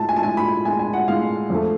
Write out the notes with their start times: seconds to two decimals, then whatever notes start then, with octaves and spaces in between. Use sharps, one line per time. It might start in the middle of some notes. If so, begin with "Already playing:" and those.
Already playing: A2 G#3 A5
0.09 G#5
0.16 A5
0.22 A2 G#3 G#5
0.37 B5
0.65 A2 G#3 G#5
0.79 G#5
0.93 F#5
1.08 A2 G#3 F5
1.50 F2 F3 A3